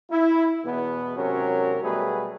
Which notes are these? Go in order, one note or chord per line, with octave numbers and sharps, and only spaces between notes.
E4
E2 B2 B3
G#1 C3 F#3 C#4 A#4
B2 F#3 G3 A3 G#4 B4